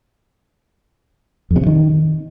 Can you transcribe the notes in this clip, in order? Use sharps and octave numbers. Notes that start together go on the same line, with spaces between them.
F2
C3
C#3
D#3